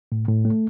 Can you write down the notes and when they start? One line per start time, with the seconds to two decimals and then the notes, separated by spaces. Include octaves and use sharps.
0.12 A2
0.28 A2
0.45 A3